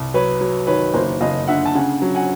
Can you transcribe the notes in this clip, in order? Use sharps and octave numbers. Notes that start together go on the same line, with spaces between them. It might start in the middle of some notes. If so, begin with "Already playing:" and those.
Already playing: C2
F#3 B4 C#5
F#3
D#3 B4 C#5
F#1 A#4 C5
F#1 D#5 F5
D3 E5 F#5
A5
C#3 F#5 G#5
F#3
F#5 G#5